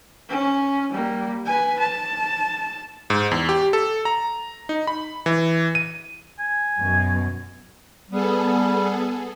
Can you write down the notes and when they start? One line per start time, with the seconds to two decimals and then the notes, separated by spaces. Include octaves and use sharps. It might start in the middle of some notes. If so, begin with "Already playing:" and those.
0.29 C#4
0.92 G3 A#3
1.46 B4 G#5
1.79 A5
3.10 G#2
3.31 E2
3.49 G4
3.73 A4
4.05 A#5
4.69 D#4
4.87 B5
5.26 E3
5.75 D#7
6.39 G#5
6.80 F#2 B2
8.10 G3 B3 G#4 A4